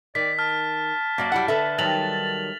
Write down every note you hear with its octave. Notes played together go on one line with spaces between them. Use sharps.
D#3 D5 B6
A5 F6
F#2 A#3 F#4 D5
G3 E4 F#5
D3 A4 B4 E5
D#3 F#3 G3 A6 F7 F#7